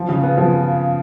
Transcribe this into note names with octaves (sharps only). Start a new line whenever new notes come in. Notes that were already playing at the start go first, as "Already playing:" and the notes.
Already playing: F3
C#3
B3
F3